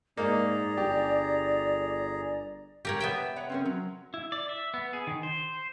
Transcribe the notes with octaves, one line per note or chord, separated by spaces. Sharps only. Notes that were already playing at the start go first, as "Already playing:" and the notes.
G#2 A#3 D#4 G#4 D5 A#5
G1 G4
G4 A#4 C#5
B3 E5 G5
B4 C#5 F#5
C4 C#4 A#4
F#3
E4
D5
E5
B3
G#4
D#3
C5